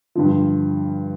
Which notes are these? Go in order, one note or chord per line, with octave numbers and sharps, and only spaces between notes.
G2 D3 F3